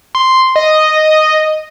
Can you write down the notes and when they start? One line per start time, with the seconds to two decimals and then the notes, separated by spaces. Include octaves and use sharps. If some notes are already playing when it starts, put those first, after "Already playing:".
0.15 C6
0.56 D#5